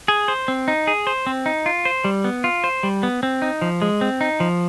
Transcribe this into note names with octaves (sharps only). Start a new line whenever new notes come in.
G#4
C5
C4
D#4
G#4
C5
C4
D#4
F4
C5
G3
B3
F4
C5
G3
B3
C4
D#4
F3
G#3
C4
D#4
F3